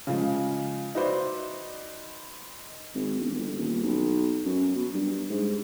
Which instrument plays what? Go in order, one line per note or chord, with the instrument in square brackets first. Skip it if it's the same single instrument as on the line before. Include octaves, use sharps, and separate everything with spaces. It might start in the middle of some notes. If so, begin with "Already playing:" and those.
[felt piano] C#3 F3 G#3
D#4 F#4 B4 C5 D5 E5
[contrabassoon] G#1
E1
G1
D#1
B1
F#2
B2
G2
G#2